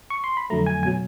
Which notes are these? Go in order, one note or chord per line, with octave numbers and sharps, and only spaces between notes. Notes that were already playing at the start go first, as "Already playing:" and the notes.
C#6
C6
B5
F2 D3 F#3 A3 A#5
G#5
B2 F#3 G#5